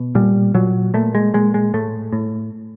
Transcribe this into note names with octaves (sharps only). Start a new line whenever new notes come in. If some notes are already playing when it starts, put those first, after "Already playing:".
Already playing: B2
A#2 G3
A#2 F#3
A#2 A3
G#3
A#2 G#3
G#3
A2 A3
A2